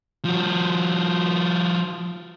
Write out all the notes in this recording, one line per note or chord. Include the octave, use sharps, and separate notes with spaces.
F3 F#4